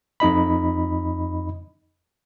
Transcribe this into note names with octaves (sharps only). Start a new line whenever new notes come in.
F2 D#4 D#5 B5